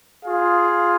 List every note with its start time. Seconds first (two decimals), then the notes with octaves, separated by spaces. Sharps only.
0.23 F4 G#4 F5